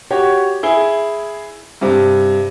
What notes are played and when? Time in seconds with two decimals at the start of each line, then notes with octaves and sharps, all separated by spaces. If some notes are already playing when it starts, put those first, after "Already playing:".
0.10 F#4 G4 C#5
0.63 E4 G#4 G7
1.81 G2 C3